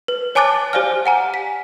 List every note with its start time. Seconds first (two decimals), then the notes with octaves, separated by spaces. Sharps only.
0.08 B4
0.35 C#5 G#5 A5 D6 F#6 A6
0.73 G4 C5 D5 F5 G#5 F6
1.06 F#5 G#5 A#5
1.34 B6